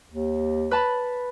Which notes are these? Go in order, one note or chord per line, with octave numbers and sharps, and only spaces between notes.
D#2
B4 A5 B5